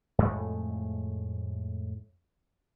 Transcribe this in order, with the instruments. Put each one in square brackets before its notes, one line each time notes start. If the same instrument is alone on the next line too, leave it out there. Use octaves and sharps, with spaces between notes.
[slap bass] F2 A2 G#3 A3